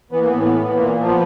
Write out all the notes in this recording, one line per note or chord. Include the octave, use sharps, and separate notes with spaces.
E3 B3
A#3
B3
A2
B3
E3
A#2 A#3
F3
B3